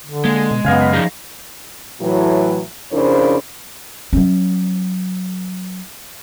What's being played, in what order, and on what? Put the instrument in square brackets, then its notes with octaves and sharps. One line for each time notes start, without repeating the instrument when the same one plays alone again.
[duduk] D3
[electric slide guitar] G#3 [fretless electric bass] A#3
[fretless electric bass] B2
[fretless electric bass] F#2 C#3 [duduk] B3 [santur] D#5 F5 G#5
[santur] B5
[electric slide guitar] F3 D#4 G#4 [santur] A#5
[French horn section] A2 E3 F#3
F2 C#3 D4 E4 A#4 C5
[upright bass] F#3 C#4